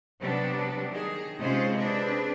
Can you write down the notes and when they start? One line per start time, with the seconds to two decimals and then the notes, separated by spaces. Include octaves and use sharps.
0.19 C3 F#3 G3 B3 D4
0.92 D#3 G#4
1.38 C3 G#3 C#4 F4 G#4 C5
1.78 C4 D4 G#4 B4